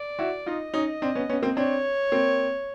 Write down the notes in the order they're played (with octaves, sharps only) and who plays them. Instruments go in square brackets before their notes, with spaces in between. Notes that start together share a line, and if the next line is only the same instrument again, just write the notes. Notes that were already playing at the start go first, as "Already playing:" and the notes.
Already playing: [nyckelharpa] D5
[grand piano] E4 F#4
[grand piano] D#4 F4 [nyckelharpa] D#5
[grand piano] C#4 D#4
C4 D4
B3 C#4
B3 C#4
A#3 C4
[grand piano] C4 D4 [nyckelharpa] C#5
[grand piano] A#3 C4